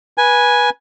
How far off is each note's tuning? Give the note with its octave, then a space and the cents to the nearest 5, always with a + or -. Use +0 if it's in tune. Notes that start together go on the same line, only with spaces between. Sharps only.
B4 -20 G#5 +0